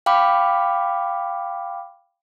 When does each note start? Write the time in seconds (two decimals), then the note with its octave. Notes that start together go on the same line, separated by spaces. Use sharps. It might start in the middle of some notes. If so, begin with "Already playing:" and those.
0.06 F5 G5 B5 D6 F6